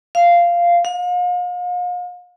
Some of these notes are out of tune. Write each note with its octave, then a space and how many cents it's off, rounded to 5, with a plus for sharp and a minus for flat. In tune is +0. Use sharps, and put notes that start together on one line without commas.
F5 -10
F5 +40